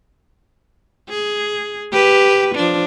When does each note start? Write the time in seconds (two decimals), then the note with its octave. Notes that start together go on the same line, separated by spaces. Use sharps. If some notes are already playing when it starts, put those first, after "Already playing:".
1.09 G#4
1.92 G4 B4
2.55 F3 D4